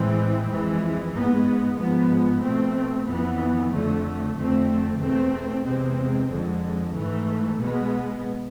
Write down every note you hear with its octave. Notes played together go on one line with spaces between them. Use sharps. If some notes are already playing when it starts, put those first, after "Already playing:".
Already playing: A2 E3 G#3 C4
F2 E3 G#3
G#2 G#3 B3
G#2 F3 G#3 B3
B2 A3 C4
F2 E3 B3
F2 D3 A3
F2 D3 A3 C4
E2 B2 A3 C4
E2 C3 G#3 C4
F2 D3 G#3
G#2 E3 A3
B2 G#3 B3